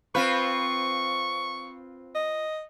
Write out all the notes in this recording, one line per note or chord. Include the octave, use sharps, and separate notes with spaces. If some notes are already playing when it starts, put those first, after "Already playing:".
C4 F4 B4 C#6
D#5